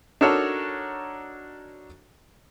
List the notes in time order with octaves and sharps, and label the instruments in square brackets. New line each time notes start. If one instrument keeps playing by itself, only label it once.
[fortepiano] D4 D#4 F#4 A4 A#4 C#5